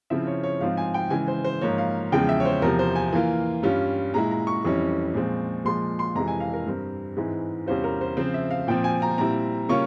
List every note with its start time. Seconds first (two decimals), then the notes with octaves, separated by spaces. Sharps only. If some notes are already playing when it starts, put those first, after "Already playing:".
0.10 C#3 F3 C4 E4 E5
0.27 C#5
0.44 C#5
0.61 G#2 F3 C4 F4 F5
0.77 G#5
0.94 G5
1.10 C#3 E3 G#3 G#5
1.28 C5
1.44 C5
1.61 G#2 F3 A#3 C#5
1.78 F5
2.12 E2 C#3 F3 G#3 G5
2.29 E5
2.40 C#5
2.45 C5
2.62 E2 C3 F3 A#4
2.79 C5
2.95 G#5
3.13 E3 A#3 F4
3.63 G2 G3 C#4 F4
4.14 A#2 G#3 E4 A#5
4.31 A#5
4.47 C#6
4.64 F2 E3 G3 C#4 E4
5.14 A#2 F3 G#3 C4
5.65 A#2 F3 G#3 C6
5.99 C6
6.15 F2 C3 E3 G#3 E4 A#5
6.28 G#5
6.40 F5
6.53 A#4
6.66 G2 G3 C4
7.16 G#2 E3 G#3 C4 E4
7.66 E2 C3 G3 C#4 F4 C5
7.84 A#4
8.01 C5
8.17 C#3 F3 C4 C5
8.34 E5
8.50 F5
8.68 A#2 F3 C4 G5
8.84 G#5
9.02 A#5
9.18 A#2 G3 C4 E4 A#5
9.69 C#3 G3 A#3 C#4 F4 C#6